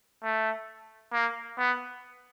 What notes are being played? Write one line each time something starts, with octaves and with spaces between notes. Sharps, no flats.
A3
A#3
B3